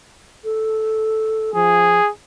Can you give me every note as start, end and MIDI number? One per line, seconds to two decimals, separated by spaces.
0.44 1.54 69
1.55 2.00 53
1.55 2.10 68